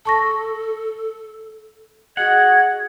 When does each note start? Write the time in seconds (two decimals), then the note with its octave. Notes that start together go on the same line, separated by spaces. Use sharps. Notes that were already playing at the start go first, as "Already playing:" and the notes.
0.05 A4 A5 C#6 A#6
2.17 F#4 G#4 D#5 F#5 G#6